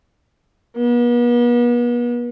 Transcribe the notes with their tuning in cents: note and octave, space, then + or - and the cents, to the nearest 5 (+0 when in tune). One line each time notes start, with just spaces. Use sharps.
B3 -40